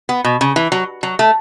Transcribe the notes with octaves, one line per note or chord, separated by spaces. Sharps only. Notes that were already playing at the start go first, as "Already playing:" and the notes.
B3
B2
C#3
E3
F#3
F#3
A3